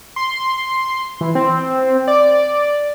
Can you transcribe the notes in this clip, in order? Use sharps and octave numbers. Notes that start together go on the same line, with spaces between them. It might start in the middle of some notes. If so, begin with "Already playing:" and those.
C6
E3
C4
D5